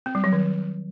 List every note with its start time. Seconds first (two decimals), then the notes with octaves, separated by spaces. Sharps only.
0.06 C4
0.15 G3
0.24 F#3
0.33 D#3